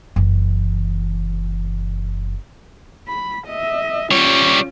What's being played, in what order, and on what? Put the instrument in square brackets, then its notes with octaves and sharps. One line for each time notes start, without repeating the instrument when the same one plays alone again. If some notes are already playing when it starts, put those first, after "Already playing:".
[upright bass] F#1 E3
[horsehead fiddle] B5
D#5 E5
[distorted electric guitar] G3 C#5 [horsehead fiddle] C#4 F4